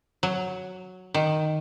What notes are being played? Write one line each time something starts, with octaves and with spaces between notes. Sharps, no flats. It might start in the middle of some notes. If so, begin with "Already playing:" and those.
F#3
D#3